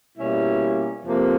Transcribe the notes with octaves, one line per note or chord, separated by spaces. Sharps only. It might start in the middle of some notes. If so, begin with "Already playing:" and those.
B2 G3 A#3 C#4 E4
F2 C3 F3 A#3